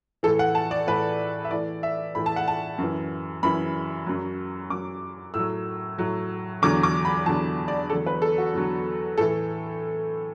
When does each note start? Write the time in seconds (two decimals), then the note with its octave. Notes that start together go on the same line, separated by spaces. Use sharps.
0.23 A2 E3 A4
0.39 F#5
0.55 A5
0.71 D5
0.87 A2 E3 B4
1.45 E5
1.51 A2 E3 D5
1.83 E5
2.15 A2 E3 B5
2.26 A5
2.36 F#5
2.48 A5
2.78 F#2 E3
3.43 F#2 E3 B5
4.06 F#2 F#3
4.70 F#2 F#3 D6
5.34 A2 F#3 E6
5.98 A2 F#3
6.62 E2 D3 F#3 D6
6.83 D6
7.05 B5
7.26 E2 D3 F#3 A5
7.68 D5
7.90 E2 D3 F#3 A4
8.06 B4
8.22 A4
8.38 F#4
8.53 E2 D3 F#3
9.18 A2 E3 A4